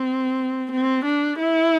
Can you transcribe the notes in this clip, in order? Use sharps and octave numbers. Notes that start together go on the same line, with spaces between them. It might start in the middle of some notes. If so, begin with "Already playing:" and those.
Already playing: C4
C4
D4
E4